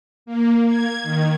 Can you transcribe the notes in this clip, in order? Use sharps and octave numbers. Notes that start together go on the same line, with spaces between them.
A#3
G#6
D#3